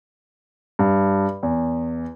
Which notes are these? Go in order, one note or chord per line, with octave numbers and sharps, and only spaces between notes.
G2
E2